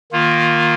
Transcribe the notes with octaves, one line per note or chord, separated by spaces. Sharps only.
D#3 A#3 F4